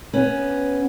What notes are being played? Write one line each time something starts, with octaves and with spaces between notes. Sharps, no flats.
B3 C#4